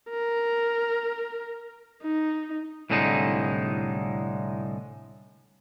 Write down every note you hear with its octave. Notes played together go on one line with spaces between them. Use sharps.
A#4
D#4
C2 A2 D3 G#3 D#4